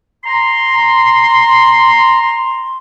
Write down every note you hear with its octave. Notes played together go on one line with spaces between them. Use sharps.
A#5 C6